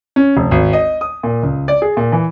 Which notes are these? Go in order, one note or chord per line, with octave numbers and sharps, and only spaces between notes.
C#4
F1
G#1
D#5
D#6
A#2
C#2
D5
G#4
A#2
E3